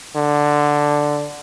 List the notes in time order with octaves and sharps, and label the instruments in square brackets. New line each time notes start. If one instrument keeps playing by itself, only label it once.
[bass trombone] D3